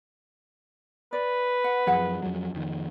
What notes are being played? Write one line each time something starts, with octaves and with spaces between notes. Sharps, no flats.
B4 D5
F#5
F#2 F3 G#4 F#5
F2 F#3
F2 D#3